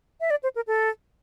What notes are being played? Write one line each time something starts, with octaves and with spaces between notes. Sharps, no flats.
E5
D5
C5
A#4
A4